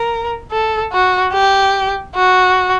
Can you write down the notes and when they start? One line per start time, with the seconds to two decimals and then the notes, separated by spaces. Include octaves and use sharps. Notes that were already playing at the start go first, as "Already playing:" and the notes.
Already playing: A#4
0.52 A4
0.92 F#4
1.33 G4
2.15 F#4